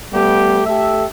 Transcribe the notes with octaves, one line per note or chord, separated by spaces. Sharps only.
G3 A3 B3 G4
A3 G4 A4 E5